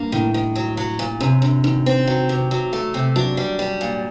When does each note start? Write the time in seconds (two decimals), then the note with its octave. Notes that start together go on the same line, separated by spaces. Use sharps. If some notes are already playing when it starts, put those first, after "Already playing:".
Already playing: G2 A#3
0.12 A2 D#3
0.34 D#3
0.56 F#3
0.77 F#3
0.99 A#2
1.20 F#2 C3
1.42 F#2 D3
1.64 F#2 D#3
1.86 C4
2.07 F#3
2.29 C3
2.51 F#3
2.73 A3
2.94 C3
3.16 F#3 D4
3.37 G3
3.59 G3
3.81 A#2